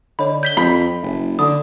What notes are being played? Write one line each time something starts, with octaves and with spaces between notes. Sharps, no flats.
D3 C#5 D#5 B5
G6 B6 G7
F2 B5
F#1 E5
D3 B5 D#6